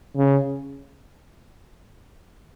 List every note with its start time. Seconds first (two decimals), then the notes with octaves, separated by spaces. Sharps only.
0.17 C#3